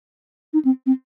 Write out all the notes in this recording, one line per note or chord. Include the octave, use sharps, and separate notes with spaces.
D#4
C4
C4